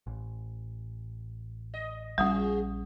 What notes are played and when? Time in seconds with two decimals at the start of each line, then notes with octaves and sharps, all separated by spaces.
0.07 A1
1.74 D#5
2.18 A#1 C#3 G3 C#4 F4 G#4 F#5 D#6